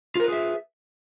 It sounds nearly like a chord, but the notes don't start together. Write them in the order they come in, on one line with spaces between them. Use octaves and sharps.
F4 A#4 B4 G#4 E5